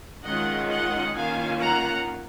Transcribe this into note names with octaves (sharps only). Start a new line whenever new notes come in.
D#3 G#3 C#4 F4 D#5 F#5
D#5 F#5
D#3 A#3 C#4 F4 F5 G#5
F#5 A#5